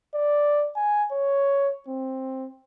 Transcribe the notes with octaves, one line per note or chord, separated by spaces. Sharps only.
D5
G#5
C#5
C4